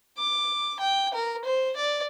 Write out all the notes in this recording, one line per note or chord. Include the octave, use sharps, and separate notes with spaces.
D6
G5
A#4
C5
D5